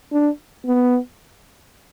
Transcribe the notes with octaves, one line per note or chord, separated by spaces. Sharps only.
D4
B3